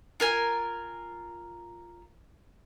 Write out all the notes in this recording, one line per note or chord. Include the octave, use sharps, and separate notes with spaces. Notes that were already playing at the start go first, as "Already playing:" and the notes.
F4 A#4 G#5